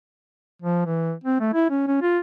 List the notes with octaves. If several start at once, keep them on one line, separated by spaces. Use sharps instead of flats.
F3
E3
C4
A3
E4
C#4
C#4
F4